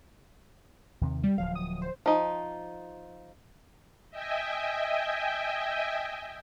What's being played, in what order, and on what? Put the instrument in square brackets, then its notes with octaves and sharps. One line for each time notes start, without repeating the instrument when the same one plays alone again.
[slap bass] D#2 C3 D#3
[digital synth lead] G3
[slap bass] D1 F3 F#3 [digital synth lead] F5
[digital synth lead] D#6
C5
[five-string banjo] F3 D#4
[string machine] D#5 E5 G5 G#5